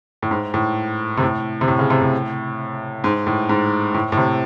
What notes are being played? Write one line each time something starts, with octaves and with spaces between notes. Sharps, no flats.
A2
G#2
A2
C3
A2
C3
A2
C#3
C3
A2
G#2
A2
G#2
A2
A2
C3